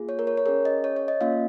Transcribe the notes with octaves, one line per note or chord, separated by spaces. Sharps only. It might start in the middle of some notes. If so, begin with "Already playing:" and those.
Already playing: A#3 F4 G#4
C#5
A#4
C#5
C#5
C#4 G#4 A#4
D#5
C#5
C#5
D#5
A#3 C#4 F4 F5